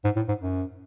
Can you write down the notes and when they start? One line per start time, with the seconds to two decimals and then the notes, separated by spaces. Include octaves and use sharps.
0.04 G#2
0.16 A2
0.28 G#2
0.41 F#2